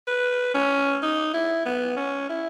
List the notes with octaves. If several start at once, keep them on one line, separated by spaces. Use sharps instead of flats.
B4
C#4
D#4
E4
B3
C#4
E4